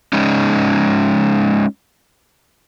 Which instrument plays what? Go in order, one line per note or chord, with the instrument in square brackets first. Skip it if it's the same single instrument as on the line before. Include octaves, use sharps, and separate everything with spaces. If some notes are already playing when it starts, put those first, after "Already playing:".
[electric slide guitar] G#3 C#4 D#4